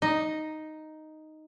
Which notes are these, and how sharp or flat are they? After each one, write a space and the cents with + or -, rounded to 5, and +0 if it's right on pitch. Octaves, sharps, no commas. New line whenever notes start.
D#4 +0 D#5 +0